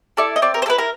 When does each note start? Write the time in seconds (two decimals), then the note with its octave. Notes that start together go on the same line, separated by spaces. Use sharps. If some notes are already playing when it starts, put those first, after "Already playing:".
0.17 E4 A4 D5
0.36 D#5
0.42 C4 D5
0.54 A#4
0.62 C5
0.66 E4 A4 B4
0.78 A#4